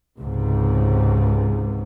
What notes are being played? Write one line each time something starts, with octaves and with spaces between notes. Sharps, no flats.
C#2 G#2 C3